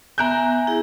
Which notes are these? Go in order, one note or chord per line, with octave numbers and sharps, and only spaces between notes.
B3 E5 G#5 A#5 F#6 G6
E4 G#4